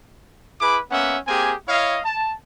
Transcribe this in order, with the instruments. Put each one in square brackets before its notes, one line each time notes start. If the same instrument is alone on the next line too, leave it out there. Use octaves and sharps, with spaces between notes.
[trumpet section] E4 G#4 B4 B5 D6
A#3 B3 C#4 E5 F#5
A#3 C4 G4 G#4 G#5
E4 C#5 D#5 F5
A5